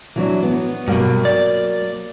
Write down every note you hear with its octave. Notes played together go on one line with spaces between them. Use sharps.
E3 F#3 D4
B3
G2 B2 F#3 A#3
D5